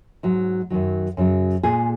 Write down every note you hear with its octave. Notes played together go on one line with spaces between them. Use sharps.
G#2 F#3
F#2 D#3 F#3
F#2 C#3 F#3
A#2 G#3 G#4